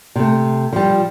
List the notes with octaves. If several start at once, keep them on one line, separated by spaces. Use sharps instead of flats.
C3 A3
F3 G3